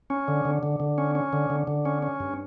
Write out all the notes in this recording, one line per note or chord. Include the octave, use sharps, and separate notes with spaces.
C#4
D3
D3
D3
D3
C#4
C#4
D3
D3
D3
C#4
C#4
G2